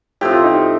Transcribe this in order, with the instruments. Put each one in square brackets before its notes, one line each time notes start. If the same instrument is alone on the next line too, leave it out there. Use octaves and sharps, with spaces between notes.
[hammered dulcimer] A2 F3 C4 [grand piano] G4
[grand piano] F4
D#4 G4